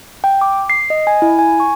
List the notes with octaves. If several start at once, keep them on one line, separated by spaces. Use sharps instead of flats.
G5
D6
C7
D#5
G#5
E4
G#5
C#6